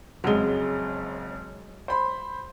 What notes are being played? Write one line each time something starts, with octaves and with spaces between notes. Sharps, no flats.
F#1 F2 F#3 G#3 G7
C5 B5 C6